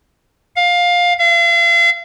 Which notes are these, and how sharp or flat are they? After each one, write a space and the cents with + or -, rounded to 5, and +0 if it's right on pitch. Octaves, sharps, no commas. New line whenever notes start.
F5 +15
F5 -40